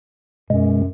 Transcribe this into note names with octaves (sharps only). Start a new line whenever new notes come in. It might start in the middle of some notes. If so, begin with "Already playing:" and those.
F#2 B2 G#3